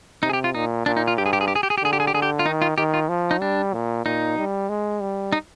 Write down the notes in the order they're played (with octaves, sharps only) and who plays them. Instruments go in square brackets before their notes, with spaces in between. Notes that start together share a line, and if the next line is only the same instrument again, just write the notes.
[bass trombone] C3 [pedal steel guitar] D#4
[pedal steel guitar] G#4
G4
F4
[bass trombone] A#2 [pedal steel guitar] D#4
[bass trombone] A#2 [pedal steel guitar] D4
[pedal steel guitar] D#4
F4
[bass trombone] G2 [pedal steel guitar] G4
[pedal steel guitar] G#4
G4
G#4
G4
G#4
G4
G#4
G4
[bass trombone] D3 [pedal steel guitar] G#4
[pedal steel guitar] G4
G#4
G4
[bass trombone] D3 [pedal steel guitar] G#4
[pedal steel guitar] G4
F4
[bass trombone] D#3 [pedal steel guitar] D#4
[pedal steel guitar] F4
[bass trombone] D#3 [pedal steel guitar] G4
[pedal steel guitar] F4
[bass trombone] F3
[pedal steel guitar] D#4
[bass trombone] G3 [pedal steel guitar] D4
[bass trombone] A#2
[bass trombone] A#2 [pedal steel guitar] D#4
[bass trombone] G3
G#3
G3
[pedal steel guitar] D#4